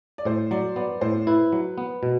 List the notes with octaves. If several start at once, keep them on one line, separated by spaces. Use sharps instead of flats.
D5
A2 C5
F#3 D5
B3 D5
A2 C5
E4 B4
F#3
B3
B2